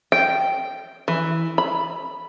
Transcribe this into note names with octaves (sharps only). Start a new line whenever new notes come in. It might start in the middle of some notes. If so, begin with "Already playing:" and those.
G5
E3
B5